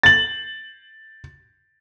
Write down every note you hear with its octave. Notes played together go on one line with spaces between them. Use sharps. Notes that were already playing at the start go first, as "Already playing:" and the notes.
A6 F#7